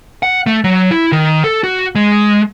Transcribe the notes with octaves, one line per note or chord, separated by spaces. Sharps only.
F#5
A3
F#3
E4
D#3
A4
F#4
G#3